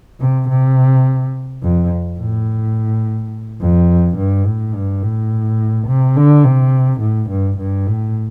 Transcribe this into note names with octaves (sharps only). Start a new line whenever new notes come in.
C3
C3
F2
A2
F2
G2
A2
G2
A2
C3
D3
C3
A2
G2
G2
A2